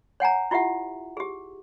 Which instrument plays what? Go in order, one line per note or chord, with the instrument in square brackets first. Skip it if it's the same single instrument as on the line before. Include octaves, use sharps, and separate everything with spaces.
[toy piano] C#5 F#5 G#5 A#5
E4 F4 G4 E5 F#5
G4 G#4